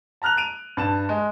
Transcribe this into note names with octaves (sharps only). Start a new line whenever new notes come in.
A5 A#5 F6 F#6 F7
D7 D#7 F7
G2 A5 E7
G#3